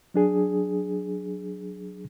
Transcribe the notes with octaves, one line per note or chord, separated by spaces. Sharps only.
F#3 D4 G#4